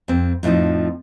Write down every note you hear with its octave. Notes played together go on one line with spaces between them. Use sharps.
F2 C4
F2 A2 E3 F3 D#4